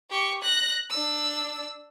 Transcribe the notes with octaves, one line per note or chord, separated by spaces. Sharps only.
G4 C#6
F#6 A#6
D4 E6